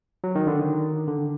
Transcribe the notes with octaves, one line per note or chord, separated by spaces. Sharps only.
F#3
D#3
D3
D#3
D3